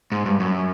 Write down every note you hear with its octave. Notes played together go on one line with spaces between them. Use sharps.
G#2
G2
F#2